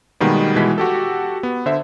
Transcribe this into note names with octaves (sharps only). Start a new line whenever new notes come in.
B2 D#3 G3 G#3 A#3 B3
B2 E3 G#3 B6
F#4 G4 A4
B3
D3 C5 E5